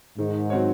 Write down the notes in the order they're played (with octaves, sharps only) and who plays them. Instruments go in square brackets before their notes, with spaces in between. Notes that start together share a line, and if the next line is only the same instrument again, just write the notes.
[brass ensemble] G#2 [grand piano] D#3
[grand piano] F#3 C4 F#4 C#5